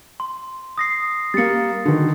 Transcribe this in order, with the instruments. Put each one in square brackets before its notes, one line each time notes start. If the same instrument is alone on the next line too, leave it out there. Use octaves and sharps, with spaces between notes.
[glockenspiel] C6
D#6 A#6 C7
[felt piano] G3 A#3 [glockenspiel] A6 C#7
[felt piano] D3 D#3